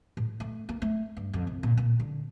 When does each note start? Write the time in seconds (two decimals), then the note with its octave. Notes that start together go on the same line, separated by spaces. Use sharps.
0.17 A2
0.40 A3
0.69 A#3
0.82 A3
1.17 G2
1.33 F2
1.47 C2
1.63 A#2
1.77 A#2
2.00 D3